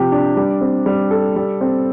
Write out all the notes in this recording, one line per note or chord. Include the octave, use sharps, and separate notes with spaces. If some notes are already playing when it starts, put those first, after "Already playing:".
Already playing: C3 F3 G4
D4
G3
C4
G3
A4
G3
C4